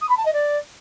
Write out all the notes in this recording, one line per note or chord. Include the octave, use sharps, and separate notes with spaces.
D#6
B5
A5
D#5
D5